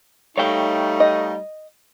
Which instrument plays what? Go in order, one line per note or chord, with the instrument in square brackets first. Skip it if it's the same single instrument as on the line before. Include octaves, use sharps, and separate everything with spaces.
[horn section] G3 A3 D#4 [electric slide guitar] C#5 F5 G5
[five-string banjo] D#5